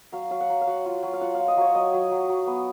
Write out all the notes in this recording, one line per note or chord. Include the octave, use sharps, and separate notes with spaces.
F#3 F5
F#3 F5
F#5
F#3
F5
F#3 F#5
F4
F#3
F5
F4 F#5
F4 F5
D#5
F#3 C#5
F#3 D#5
F#3
F#3
F#3
B3